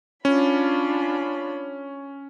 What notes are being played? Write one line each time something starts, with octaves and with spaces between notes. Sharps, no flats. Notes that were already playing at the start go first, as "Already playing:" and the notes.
C#4 D4 F4 B5